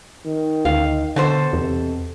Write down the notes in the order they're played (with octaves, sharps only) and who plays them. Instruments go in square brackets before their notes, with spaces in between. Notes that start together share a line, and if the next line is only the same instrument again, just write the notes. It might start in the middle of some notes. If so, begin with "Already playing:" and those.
[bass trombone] D#3
[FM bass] D2 [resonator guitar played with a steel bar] F5
[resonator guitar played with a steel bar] B2 A4 C5 [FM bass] D3
[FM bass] E2 [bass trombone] C3